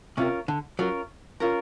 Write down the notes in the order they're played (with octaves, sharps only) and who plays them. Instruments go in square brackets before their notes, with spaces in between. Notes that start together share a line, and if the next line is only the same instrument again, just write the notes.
[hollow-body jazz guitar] C3 [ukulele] C#4 F4 A#4
[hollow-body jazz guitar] D3
[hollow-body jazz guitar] F#3 [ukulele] C#4 F4 A#4
[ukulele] C#4 F4 A#4